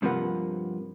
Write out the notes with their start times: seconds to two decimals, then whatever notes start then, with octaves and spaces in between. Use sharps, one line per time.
0.02 G2 C3 F3 A#3 B4 F#5